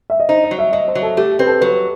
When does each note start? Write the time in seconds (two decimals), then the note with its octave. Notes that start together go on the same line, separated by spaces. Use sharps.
0.10 E5
0.20 D#5
0.29 D#4 C5
0.44 D#5
0.51 F#3
0.59 E5
0.73 F#3 D#5
0.88 C5
0.95 F#3
1.02 A4
1.17 A3 G4
1.32 A4
1.39 C4 B4
1.47 A4
1.61 F#3 B4